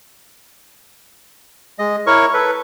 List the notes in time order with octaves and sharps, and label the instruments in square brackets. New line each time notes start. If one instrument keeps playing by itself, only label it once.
[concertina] G#3 D#5
E4 A#4 C#5 C#6
A4 B4